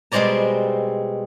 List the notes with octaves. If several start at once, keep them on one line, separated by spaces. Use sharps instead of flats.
B2 G3 G#3 C4 D5 A#5